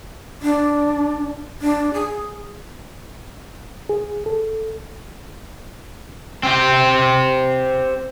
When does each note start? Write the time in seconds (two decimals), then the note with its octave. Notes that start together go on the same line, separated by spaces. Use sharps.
0.42 D4
1.62 D4
1.94 G#4
3.89 G#4
4.26 A4
6.43 C4 G4